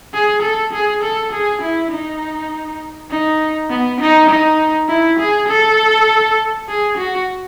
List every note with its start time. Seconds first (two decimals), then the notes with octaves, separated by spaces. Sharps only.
0.14 G#4
0.42 A4
0.73 G#4
1.03 A4
1.32 G#4
1.62 E4
1.91 D#4
3.11 D#4
3.70 B3
4.01 D#4
4.29 D#4
4.89 E4
5.20 G#4
5.48 A4
6.68 G#4
6.98 F#4